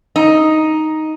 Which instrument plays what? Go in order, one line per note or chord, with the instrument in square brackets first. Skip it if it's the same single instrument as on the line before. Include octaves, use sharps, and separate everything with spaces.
[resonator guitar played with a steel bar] D#4